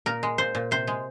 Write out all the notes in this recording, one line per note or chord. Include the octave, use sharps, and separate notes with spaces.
A#2 A#4
G#3
A#2 C5
A#2
C3 C5
G#3